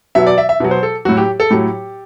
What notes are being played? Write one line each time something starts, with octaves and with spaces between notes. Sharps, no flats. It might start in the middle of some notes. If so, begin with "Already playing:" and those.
B2 F#3 E5
D5
E5
E5
B2 F#3
C5
A4
A2 F#3 F#4
G4
A4
A2 F#3 G4